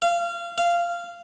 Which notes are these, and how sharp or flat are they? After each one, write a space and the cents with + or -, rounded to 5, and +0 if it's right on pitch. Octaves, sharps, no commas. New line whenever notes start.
F5 -25
F5 -15